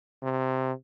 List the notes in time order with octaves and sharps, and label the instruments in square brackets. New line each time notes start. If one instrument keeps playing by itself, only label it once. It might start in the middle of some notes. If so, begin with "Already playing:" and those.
[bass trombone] C3